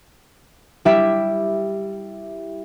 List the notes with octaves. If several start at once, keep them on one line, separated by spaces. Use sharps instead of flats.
G3 E4 G4 E5